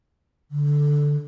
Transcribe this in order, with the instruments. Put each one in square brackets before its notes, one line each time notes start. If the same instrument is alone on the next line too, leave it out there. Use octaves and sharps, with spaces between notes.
[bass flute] D3